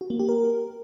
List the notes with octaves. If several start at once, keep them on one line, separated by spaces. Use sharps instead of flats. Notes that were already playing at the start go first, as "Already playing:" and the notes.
F#4
A#3
G4
A#4